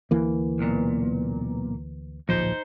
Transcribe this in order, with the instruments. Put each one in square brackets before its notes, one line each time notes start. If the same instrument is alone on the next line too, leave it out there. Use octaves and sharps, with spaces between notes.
[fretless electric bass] D2 E3 A#3
[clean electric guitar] B1 A#2
[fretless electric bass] D1 A#1 F3 [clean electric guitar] D#4 C5